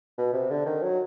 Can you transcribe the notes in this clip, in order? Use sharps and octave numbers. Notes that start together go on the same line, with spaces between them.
B2
C3
D3
D#3
F#3